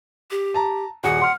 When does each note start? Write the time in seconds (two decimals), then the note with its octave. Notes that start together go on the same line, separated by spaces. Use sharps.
0.31 G4
0.54 A5 A#5
1.04 D#1 F#4 G#4 F#5
1.21 C6 F6